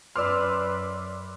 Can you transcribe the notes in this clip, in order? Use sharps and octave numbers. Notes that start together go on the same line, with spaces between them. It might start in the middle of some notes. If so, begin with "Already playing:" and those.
F#2 B4 D5 C6 D6 E6 F6